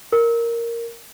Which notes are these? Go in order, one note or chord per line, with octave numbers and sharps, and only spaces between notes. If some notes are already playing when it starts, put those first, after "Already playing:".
A#4